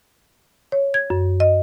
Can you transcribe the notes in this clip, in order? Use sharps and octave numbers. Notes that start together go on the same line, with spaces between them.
C#5
G#6
F#2
D#5